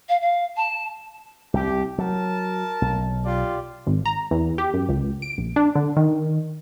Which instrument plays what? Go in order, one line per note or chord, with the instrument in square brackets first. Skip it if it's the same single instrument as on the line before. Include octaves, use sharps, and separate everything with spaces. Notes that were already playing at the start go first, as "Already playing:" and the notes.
[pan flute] F5
F5
A5
[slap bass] C2 [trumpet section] G4
[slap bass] F#3 [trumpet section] A#4 A5
[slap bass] B1
[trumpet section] F4 G4 D5
[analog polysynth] G#1
A#5
E2
G4
F#2
C#2
D7
A#1
D4
D3
D#3